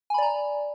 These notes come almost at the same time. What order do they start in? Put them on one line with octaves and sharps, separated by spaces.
G#5 B5 D5 A#5